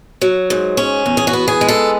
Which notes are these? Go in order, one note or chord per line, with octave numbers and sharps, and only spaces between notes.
F#3
G#2
C#4
E2
G#4
F#4
B3
G#4
G#3
A4